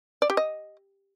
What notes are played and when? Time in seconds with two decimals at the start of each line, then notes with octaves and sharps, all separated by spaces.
0.22 D5
0.30 G4
0.37 D#5